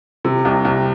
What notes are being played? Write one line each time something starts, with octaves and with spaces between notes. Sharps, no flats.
C3
C2
C2